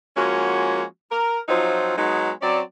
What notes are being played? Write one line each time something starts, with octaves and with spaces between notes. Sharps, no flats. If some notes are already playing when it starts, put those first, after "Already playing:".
F3 G#3 A#3 C#4 F#4
A#4
F3 F#3 C4 D#4 F4 C5
F#3 G#3 B3 D#4
F#3 C4 C#4 D5